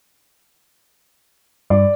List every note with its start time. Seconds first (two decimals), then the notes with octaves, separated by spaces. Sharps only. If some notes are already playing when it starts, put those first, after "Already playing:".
1.70 G2 D5